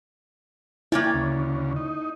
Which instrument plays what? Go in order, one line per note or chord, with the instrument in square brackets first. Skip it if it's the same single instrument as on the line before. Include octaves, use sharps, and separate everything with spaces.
[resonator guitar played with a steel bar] A#3 C#5 D5 [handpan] E4 [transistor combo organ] G5 G#5
[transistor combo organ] D2 C#3
D#4